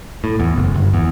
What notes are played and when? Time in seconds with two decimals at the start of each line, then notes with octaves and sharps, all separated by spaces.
0.24 A2
0.40 E2
0.56 F#1
0.74 G1
0.94 E2